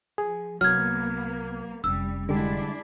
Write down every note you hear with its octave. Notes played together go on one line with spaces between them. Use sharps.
F3 G#4
C2 F#3 A#3 B3 F6 G#6
F1 G3 C#4 E6
D3 G3 G#3 D4 E4